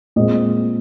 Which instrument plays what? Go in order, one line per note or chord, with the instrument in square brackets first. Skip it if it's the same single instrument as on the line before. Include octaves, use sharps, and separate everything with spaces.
[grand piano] A#2 G#3 C4 D#5